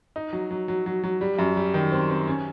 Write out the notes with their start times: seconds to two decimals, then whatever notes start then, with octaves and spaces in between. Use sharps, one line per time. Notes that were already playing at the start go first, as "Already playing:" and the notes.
0.16 D#4
0.33 F#3
0.51 F#3
0.68 F#3
0.86 F#3
1.03 F#3
1.21 G3
1.38 F#2
1.57 G3
1.74 D#3
1.92 C4
2.10 C4
2.27 C#4